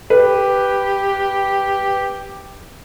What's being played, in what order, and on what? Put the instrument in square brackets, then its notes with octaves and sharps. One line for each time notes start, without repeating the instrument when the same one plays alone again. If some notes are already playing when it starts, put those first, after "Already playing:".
[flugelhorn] G4 [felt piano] B4